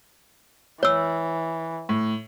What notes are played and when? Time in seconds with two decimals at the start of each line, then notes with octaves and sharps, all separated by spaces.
0.83 E3 C#5 E6
1.89 A2